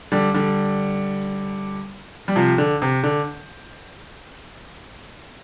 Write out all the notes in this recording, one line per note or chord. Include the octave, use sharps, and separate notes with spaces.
D3 G3
D3 G3
G3
C3 F3
D3
C3
D3